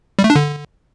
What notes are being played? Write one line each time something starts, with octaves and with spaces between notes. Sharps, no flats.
G3
A3
D4
D3